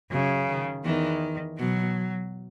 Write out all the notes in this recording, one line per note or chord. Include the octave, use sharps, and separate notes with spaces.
F#2 C#3 F#3
D#3
E2 D#3 E3
B2 F#3